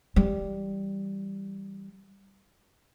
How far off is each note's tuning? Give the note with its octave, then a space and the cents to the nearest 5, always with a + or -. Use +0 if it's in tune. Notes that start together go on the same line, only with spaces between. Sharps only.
E3 +5 G3 +0